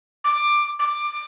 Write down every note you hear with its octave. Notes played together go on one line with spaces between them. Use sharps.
D6
D6